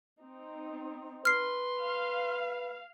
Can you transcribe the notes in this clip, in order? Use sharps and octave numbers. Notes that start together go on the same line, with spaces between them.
C4 D#4
B4 C6 F6 C7
F5